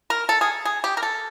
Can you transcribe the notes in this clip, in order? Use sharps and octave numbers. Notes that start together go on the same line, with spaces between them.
A#4
A4
G#4
G#4
G4
A#4
A4